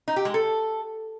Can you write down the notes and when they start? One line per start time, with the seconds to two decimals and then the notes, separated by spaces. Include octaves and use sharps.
0.08 D#4
0.16 G4
0.25 G#3
0.34 A4